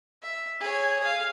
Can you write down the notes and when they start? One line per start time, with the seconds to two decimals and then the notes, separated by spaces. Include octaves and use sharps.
0.23 E5
0.61 G#4 C#5
1.00 G#4 F5